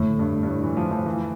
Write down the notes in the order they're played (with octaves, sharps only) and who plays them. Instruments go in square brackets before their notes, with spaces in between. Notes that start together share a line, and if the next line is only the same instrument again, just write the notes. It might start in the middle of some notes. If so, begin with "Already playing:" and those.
Already playing: [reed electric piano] F2 D3 A3 [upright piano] A2
[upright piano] G2
G2
A2
E3
F3
F3
E3